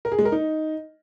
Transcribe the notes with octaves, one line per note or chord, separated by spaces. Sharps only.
A#4
G#4
G#3
A#4
D#4